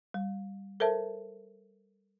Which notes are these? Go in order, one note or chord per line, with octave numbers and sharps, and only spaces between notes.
G3
A4 A#4 C5 E5 A5